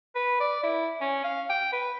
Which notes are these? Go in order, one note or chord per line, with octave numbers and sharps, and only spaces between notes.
B4
D5
E4
C#4
F5
G5
B4